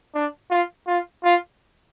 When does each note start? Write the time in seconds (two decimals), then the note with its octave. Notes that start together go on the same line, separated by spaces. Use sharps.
0.14 D4
0.50 F4
0.87 F4
1.24 F4